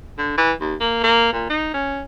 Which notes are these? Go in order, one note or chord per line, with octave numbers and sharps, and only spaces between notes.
D3
E3
D#2
A#3
A#3
A#2
D#4
C#4